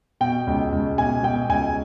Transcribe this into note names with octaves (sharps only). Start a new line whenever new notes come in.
B2 G5
C#2
C#2
B2 G#5
B2 G5
C#2 G#5